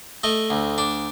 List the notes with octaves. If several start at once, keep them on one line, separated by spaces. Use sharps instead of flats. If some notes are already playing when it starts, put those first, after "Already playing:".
A3 D#5
D2
D4